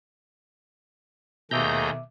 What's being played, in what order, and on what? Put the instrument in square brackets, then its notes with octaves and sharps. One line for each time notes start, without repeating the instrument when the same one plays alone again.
[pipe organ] D#2 A3 G#4 [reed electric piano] B2 E5 D6 [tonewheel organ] A#5 G6